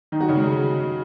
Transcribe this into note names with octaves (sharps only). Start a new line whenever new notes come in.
D#3 D#4
F#3 F#4
C#3 C#4
G#3